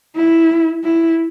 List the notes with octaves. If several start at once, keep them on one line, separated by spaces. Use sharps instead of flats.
E4
E4